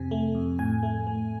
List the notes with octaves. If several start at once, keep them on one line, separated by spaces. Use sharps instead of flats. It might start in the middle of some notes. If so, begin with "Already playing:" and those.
Already playing: F2 C3 G#5
A3
F2
A2 G#5
A3
A3